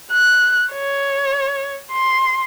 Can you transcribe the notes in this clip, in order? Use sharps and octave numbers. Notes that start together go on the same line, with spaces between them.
F#6
C#5
C6